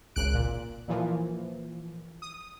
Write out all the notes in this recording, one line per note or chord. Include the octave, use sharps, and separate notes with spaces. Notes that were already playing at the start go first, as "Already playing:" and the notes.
G#1 C#2 F#6 D7
A#2
A#2 E3 F3
D#6